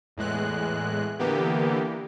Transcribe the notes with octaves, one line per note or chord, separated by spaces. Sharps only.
E2 A2 G#3 F#6
D3 E3 A#3 B3 G4